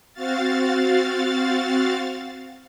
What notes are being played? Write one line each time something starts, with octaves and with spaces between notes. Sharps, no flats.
C4 F#4 F5 A6